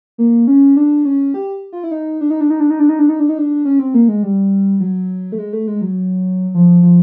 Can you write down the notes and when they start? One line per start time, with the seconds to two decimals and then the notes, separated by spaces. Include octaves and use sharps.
0.18 A#3
0.47 C#4
0.76 D4
1.05 C#4
1.34 G4
1.73 F4
1.84 E4
1.91 D#4
2.21 D4
2.30 D#4
2.41 D4
2.50 D#4
2.60 D4
2.70 D#4
2.79 D4
2.89 D#4
2.99 D4
3.09 D#4
3.20 D4
3.29 D#4
3.38 D4
3.65 C#4
3.79 C4
3.94 A#3
4.08 G#3
4.23 G3
4.80 F#3
5.32 A3
5.38 G#3
5.53 A3
5.67 G#3
5.81 F#3
6.54 F3
6.83 F3